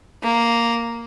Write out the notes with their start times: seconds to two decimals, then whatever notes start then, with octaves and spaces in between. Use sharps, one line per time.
0.23 A#3